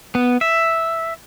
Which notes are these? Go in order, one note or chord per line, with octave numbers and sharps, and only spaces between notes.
B3
E5